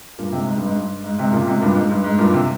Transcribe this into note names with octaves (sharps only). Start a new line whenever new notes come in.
G2 A#2
G#2 C3
G#2
G2
G#2
G2
G#2
G#2 C3
A#2 C#3
G#2 C3
G2 A#2
G#2
G2
G#2
G2 A#2
C3